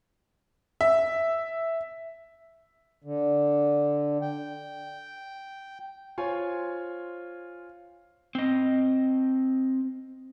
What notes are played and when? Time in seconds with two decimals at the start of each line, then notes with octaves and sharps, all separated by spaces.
0.81 E5
3.04 D3
4.22 G5
6.18 F4 C5 C#5 G#5
8.35 C4 D#5